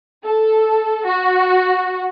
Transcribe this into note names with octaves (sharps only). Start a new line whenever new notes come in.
A4
F#4